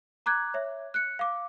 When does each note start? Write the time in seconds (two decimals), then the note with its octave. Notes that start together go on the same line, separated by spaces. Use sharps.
0.26 A#5 D6 F#6 G#6
0.54 C#5 E5
0.94 F#6 C#7
1.19 F5 D6